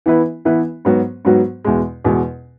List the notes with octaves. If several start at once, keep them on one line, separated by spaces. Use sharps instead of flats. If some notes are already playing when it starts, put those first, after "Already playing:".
E3 B3 E4 B4
E3 B3 E4 B4
G#2 F#3 B3 F#4
G#2 F#3 B3 F#4
E2 B2 G#3
E2 B2 G#3